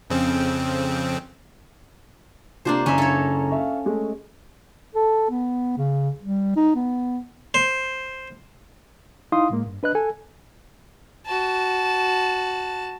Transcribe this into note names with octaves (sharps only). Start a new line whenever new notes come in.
F2 C#3 C4
C3 A#3 D4 F4 C5
F#1 C#4 E5 A#5
A4 C#5
E5 F5
G#3 A3
A4
B3
C#3
G3
D#4
B3
C5
D#4 E4 F5 C6 D#6
A2 G#3 A#3
G2
D4 B4 D#5 F#6
A4 G#5
F#4 A5